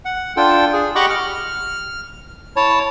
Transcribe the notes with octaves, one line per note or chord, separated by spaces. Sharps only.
F#5
D4 F4 A4 G5
G#4
G4 D#5 F#5 B5 C#6 D6
F6
E4 C#5 A5